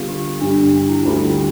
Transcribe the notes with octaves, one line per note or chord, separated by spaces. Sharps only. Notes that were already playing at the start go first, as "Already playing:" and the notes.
Already playing: D3 G3 B3 F4 A4
G4
G2 D3 G3 D4
D4
E4
E4
D2 D3 G3 F4
F4